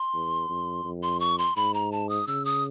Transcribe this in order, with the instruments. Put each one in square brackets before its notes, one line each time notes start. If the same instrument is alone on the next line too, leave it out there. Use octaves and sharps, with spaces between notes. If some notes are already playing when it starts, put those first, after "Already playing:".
Already playing: [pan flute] C6
[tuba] E2
F2
F2
[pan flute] C6
C#6
C6
[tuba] G#2 [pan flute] B5
[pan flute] A#5
A5
D#6
[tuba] C#3 [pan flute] E6
[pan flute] D#6